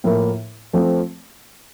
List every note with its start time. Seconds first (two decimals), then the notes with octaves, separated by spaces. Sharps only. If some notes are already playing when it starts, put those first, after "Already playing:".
0.04 A2 F3 A#3 E4 A#4
0.73 F3 A3 C4